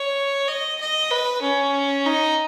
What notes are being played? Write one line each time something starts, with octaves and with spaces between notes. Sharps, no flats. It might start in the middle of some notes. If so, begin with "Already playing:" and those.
Already playing: C#5
D#5
D#5
B4
C#4
D#4